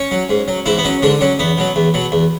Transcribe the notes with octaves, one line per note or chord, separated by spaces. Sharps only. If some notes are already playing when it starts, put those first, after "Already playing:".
Already playing: C#4 C#5
F#3
G#2
F#3
G#2 E3 E4
B3
F#3 C#4
G#2 D3 D4
F#3 C#4
E2 B3
B2 F#3
E2
B2 F#3
E2